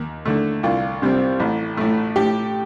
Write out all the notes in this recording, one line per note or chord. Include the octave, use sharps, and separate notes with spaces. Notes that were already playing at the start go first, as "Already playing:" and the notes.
Already playing: D#2
D3 A3
C2 F4
C3 G3 C4
A1
A2 A3
A2 G4